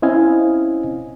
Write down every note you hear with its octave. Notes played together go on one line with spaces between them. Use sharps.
C4 C#4 E4 D#5 F5 G#5